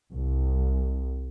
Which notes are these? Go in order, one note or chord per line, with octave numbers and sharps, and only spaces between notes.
C2